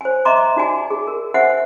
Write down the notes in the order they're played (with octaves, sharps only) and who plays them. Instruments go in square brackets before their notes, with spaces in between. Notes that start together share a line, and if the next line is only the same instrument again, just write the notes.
[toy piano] C5 G#5
D#5 E5 A#5 C6 D6
D#4 F#4 D5 G#5
G#4
A#4
C5 E5 F#5 G#5